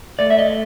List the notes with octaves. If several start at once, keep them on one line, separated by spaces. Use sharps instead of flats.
A3 D5
E5
D#5